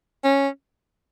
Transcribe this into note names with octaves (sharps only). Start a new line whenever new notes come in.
C#4